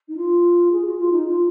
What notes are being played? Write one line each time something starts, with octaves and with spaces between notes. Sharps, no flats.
D#4
F4
G#4
F#4
F4
D#4
F4